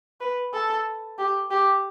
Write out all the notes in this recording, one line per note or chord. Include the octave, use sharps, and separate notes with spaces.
B4
A4
G4
G4